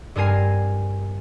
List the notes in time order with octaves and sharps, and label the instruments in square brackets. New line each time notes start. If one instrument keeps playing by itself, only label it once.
[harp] G2 C4 A#4 G#5 C7